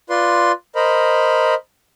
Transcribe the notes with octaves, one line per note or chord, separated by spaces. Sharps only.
F4 B4 D5 C6
A#4 C5 D#5 B5